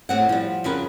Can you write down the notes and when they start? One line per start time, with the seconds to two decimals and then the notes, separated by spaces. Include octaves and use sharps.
0.09 A2 C4 F#5
0.29 F3 G3
0.64 F2 C#3 A#4 B4